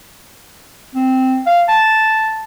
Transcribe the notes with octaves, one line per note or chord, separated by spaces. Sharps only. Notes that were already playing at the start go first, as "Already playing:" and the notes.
C4
F5
A5